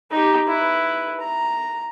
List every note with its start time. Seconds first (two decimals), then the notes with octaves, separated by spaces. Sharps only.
0.11 D#4 G4
0.48 E4 B4
1.20 A#5